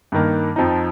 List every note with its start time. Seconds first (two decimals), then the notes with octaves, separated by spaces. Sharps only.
0.12 G2 D#3 A#3
0.56 F2 F3 D#4